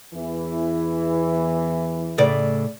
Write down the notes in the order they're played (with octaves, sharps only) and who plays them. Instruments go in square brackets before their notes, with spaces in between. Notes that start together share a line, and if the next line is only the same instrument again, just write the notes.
[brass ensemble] E2 E3
[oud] A2 C#3 D5